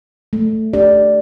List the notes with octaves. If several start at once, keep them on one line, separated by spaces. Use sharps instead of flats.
A3
D4 G4 D5